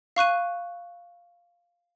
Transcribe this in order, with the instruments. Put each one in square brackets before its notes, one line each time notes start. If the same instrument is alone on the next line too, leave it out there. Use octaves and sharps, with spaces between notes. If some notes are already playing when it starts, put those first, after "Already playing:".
[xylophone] F5 C#6 F#6 D#7